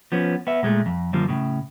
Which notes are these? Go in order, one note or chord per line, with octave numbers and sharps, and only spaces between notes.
F3 B3 C#4
B3 E5
A#2 G#3 A3
F2
F#2 D3 F3 G3 A#3
A2 C#3